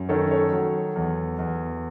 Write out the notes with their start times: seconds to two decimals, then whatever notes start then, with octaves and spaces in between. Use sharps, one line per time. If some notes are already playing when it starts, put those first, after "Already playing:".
Already playing: F#2
0.09 D#3 A4 C#5
0.31 A4 C#5
0.52 F#3
0.96 E2
1.39 E2